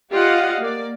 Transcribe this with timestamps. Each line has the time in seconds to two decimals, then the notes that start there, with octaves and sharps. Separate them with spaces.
0.12 F4 G4 D5 D#5 F5 F#5
0.61 A#3 D5